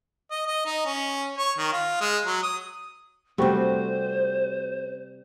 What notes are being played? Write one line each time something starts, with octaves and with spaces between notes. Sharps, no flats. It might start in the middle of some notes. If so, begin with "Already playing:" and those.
D#5
D#5
D#4
C#4
C#5
D#3
F4
G#3
F#3
D#6
C3 G3 A3 C4 F#4 C5